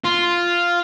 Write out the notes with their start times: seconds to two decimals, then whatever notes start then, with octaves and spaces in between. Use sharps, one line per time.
0.04 F4